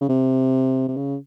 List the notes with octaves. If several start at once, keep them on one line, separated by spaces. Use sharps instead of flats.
C#3
C3
C3
C#3